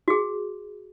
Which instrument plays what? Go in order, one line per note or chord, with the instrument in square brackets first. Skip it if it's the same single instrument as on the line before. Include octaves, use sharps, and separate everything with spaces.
[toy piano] F#4 G#4